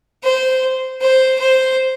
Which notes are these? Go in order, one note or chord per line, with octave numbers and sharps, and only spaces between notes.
C5
C5
C5